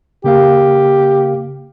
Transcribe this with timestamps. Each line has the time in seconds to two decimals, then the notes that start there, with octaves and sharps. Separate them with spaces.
0.24 C#3 A#3 G4 F5